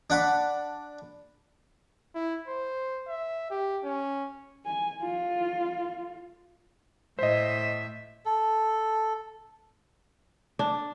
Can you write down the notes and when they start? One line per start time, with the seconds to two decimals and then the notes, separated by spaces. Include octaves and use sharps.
0.10 D4 F#5 B5
2.15 E4
2.48 C5
3.08 E5
3.51 G4
3.83 C#4
4.66 G#5
5.02 F4
7.19 A2 C5 D#5 E5
8.25 A4
10.59 D4